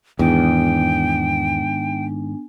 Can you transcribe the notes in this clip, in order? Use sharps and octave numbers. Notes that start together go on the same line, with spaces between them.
E2 G#2 D#3 B3 D4 G5 G#5